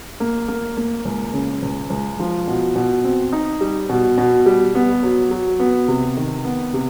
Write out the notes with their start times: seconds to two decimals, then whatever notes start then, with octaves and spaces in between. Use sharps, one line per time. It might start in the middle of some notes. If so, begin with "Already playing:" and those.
0.20 A#3
0.48 A#3
0.77 A#3
1.05 C#2
1.34 C#3
1.62 C#2
1.90 C#2
2.19 F3
2.48 B2
2.76 B2
3.04 C4
3.33 D#4
3.61 G3
3.89 B2
4.18 B2
4.46 G3
4.75 B3
5.03 F#3
5.31 F#3
5.60 B3
5.88 C3
6.17 D#3
6.45 B3
6.74 C3